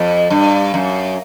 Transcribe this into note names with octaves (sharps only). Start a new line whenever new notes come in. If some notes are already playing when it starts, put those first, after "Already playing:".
Already playing: F2
G2
F#2